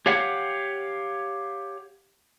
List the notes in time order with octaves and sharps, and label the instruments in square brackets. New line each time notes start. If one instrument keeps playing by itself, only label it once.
[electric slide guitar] G4 C#5 F5 F#5